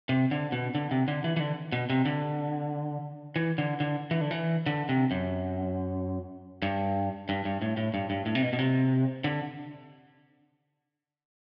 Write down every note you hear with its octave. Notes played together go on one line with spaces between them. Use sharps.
C3
D3
B2
D3
C3
D3
E3
E3
D3
B2
C3
D3
E3
D3
D3
E3
D3
E3
D3
C3
F#2
G2
G2
G2
A2
A2
G2
G2
A2
C3
B2
B2
C3
D3